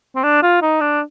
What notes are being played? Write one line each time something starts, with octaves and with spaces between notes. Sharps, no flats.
C4
D4
F4
D#4
D4